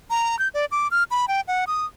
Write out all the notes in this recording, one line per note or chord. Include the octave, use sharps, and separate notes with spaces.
A#5
G6
D5
D6
F6
B5
G5
F#5
D#6